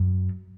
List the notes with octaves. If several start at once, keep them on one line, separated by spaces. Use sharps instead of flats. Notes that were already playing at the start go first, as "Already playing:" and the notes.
Already playing: F#2